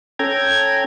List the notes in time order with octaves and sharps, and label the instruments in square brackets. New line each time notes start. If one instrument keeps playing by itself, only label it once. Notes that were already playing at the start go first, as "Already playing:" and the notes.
[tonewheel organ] C#4 A4 G5 A#5 G#6